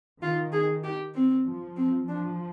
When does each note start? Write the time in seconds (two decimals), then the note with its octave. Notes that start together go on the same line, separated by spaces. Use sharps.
0.22 D#3 F4
0.52 G#4
0.84 G4
1.14 C4
1.46 F3
1.76 C4
2.08 F3 D4